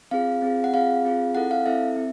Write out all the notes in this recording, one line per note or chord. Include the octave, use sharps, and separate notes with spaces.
C4 F4 G#4 F5
C4 F4 G#4
F#5
C4 F4 G#4 F5
C4 F4 G#4
C4 E4 A4 F#5
F5
C4 E4 A4 E5
C4